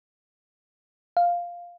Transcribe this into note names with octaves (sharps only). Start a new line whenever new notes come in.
F5